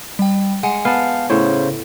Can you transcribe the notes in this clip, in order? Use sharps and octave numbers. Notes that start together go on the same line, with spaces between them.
G3 G5
G#3 F#5 G#5 C#7
B3 F5 A5
A2 C#3 C5 C#5